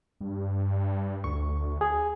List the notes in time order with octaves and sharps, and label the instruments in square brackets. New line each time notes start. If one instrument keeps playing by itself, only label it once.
[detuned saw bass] G2
[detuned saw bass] D2 [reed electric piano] C#6
[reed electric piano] G#4